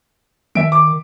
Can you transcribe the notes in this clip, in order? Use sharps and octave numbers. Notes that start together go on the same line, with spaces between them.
D#3 E5 D7
D6